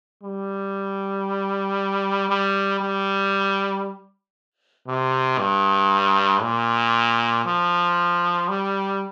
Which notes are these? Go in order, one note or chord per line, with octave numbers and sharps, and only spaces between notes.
G3
G3
G3
C3
G2
A#2
F3
G3